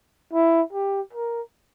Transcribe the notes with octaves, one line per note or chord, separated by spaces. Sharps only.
E4
G4
A#4